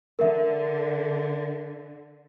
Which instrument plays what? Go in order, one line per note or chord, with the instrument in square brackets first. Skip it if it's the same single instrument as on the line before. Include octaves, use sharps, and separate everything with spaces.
[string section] D3 [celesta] A#4 E5